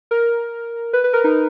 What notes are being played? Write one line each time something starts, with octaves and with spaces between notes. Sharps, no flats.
A#4
B4
B4
A#4
D#4